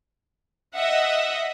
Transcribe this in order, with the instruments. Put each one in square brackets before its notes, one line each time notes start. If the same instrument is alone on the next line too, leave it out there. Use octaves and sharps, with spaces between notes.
[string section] D#5 E5 F#5